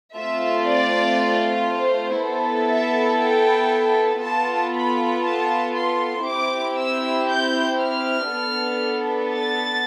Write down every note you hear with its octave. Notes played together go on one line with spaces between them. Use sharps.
A3 C4 F4 E5
D5
C5
B3 E4 A4
E5
G5
B3 F4 A4 A5
B5
A5
C6
C4 E4 G4 D6
E6
G6
F6
B3 D4 A4
A6